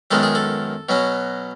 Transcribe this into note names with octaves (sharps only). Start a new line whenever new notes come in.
F#2 D#3 G#3 B3 D#4 A4
G#4
A4
B2 F#3 C#4